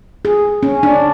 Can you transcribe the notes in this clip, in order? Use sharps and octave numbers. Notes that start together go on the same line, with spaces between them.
G#4
C#4
D4